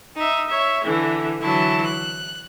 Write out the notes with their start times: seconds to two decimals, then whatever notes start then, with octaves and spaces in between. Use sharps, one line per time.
0.16 D#4 E5
0.48 C#5 E5
0.84 D3 E3
1.41 D3 E3 F#3 E4 A5
1.86 F#6